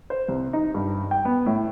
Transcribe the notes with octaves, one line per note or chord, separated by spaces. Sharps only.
C5
C2
D#4
G2
G5
B3
A2